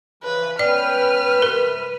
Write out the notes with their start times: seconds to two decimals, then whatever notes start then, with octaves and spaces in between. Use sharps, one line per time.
0.23 C#3 E3 F3 B4
0.59 B3 C#4 B4 D5 G5 F6
1.42 C3 A#4